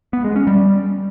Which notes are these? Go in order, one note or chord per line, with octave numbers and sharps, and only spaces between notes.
B3
G#3
C#4
G3